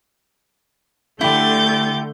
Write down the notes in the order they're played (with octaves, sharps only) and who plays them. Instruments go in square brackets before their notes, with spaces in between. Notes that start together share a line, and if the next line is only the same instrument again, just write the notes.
[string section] D3 A3 [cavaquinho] E4 G4 [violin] G6 A6